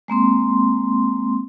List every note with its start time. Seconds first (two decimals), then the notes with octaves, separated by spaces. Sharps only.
0.08 G#3 A#3 C4 C6